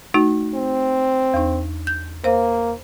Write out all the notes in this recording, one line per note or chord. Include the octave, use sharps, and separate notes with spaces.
A3 D#4 F#4
C4
E2 D#4
G6
A#3 C5 F5